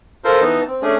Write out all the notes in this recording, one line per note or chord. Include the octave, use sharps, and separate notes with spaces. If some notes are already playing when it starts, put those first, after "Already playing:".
F4 A4 A#4 C5
E3 B3 D#4 A5
C4
A3 C#4 D4 G#4